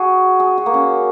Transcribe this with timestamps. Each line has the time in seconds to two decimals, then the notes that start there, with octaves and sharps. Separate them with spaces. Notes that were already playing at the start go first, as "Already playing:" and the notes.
Already playing: F#4 G#4
0.40 G#4
0.58 F#4
0.66 A#3
0.74 C#4